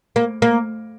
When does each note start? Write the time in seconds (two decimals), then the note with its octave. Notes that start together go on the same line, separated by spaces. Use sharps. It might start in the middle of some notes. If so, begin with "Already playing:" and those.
0.16 A#3
0.42 A#3